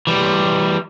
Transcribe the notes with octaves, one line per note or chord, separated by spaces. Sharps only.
E3 G3